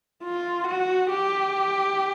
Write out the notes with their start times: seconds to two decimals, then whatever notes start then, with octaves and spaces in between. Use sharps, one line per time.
0.24 F4
0.67 F#4
1.10 G4